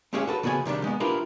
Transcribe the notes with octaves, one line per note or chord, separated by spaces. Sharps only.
G#3 A3 C#4 G4 G#4 F5
F#4 A4 B4
C#3 B3 F#4 G#4 G#5
C3 D#3 G3 D4
G#3 B3
D4 E4 F4 G4 A#4 B4